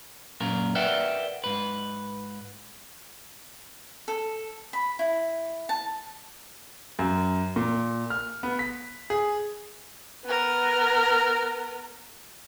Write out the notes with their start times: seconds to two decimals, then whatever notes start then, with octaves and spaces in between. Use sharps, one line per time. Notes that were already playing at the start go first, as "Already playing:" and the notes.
0.40 F#2 A#2 A#4
0.75 A#4 B4 D5 E5 F#5 G5
1.44 G#2 B4
4.08 A4
4.73 B5
4.99 E4
5.69 A5
6.99 F#2
7.56 A#2
8.10 F6
8.43 B3
8.59 B6
9.10 G#4
10.25 B3 A#4